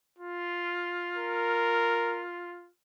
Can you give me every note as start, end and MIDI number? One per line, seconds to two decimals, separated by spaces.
0.18 2.69 65
1.16 2.24 70